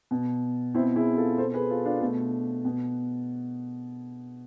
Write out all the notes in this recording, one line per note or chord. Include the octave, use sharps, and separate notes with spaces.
B2
B2 C4 E4
E4 G#4
F4 A4
B2 A4 C5
G#4 B4
F4 A4
D4 F4
B2 A3
B2